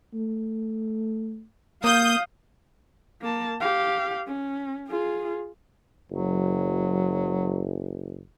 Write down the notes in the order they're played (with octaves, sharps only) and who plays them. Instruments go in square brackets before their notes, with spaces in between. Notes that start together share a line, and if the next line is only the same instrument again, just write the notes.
[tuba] A3
[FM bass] A#3 [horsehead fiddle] F5 [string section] D#6 G6
[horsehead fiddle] A#3 A5
G4 F5
C#4
F4 G#4
[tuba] F#1 [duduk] F#3